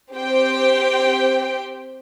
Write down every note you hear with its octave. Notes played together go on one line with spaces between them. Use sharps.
C4 G4 C5 G5